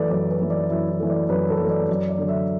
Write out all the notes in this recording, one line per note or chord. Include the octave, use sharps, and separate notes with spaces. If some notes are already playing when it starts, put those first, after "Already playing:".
Already playing: F#2 E3 A3 A4 B4 D5
F#2 D5
B4
E3 A3
D5
F#2 E4
E4
E3 A3
D5
F#2 B4
A4
E3 A3
D5
F#2 D5
D5
D3 F#3
E5